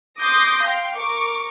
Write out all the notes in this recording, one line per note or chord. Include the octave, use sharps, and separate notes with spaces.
C6 D6 D#6 G6 A#6
F5 G5 C6
A#4 C#6 D6